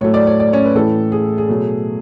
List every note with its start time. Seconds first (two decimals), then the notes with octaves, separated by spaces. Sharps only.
0.01 A2 F#3 A3 C#5
0.14 D5
0.27 C#5
0.40 D5
0.53 C#4 C#5
0.65 B4
0.75 A2 E3 A3 A4
1.12 G#4
1.38 G#4
1.49 B2 F#3 A3